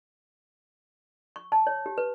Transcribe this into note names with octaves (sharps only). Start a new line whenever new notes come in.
C#6
A5
C#5
G4
B4